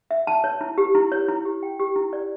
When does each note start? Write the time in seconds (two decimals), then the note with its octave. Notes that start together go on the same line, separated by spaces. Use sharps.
0.11 E5
0.27 A5
0.44 C#5
0.61 E4
0.78 G4
0.95 E4
1.12 C#5
1.28 E4
1.45 G4
1.63 G5
1.79 G4
1.96 E4
2.13 D5